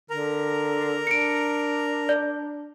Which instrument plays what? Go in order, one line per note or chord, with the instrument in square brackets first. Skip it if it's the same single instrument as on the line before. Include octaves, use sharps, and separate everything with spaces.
[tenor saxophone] D3 [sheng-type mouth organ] A#4 A#5
[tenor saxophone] D4 [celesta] C#7 D7
[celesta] D5